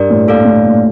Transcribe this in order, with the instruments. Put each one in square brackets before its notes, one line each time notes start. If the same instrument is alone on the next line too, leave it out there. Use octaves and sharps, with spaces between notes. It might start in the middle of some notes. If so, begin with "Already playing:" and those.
Already playing: [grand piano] G2 [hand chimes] G4 A#4 D5
[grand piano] A2
[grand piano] A#2 [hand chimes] D4 A4 D5 F5
[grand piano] A3
A#2